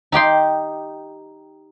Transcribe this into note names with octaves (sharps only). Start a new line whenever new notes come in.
D#4 G4 G5 C6